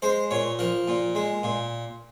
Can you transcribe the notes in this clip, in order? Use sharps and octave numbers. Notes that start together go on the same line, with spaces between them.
G#3 C5
A#2 C#5
F3 A#4
A#2
G#3
A#2